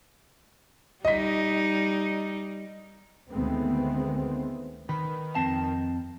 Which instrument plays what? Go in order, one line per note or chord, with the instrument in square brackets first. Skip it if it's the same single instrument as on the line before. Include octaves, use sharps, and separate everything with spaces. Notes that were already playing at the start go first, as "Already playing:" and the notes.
[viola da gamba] G3 D#4 [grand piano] D#5 B6
[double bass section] D2 D#3 G#3 A3 B3 C4
[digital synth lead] D#3 [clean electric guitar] B4
[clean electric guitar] F2 C4 A5